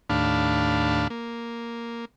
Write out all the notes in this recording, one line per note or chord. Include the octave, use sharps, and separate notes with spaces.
D#2 A2 D4 F5 A5 B5
A#3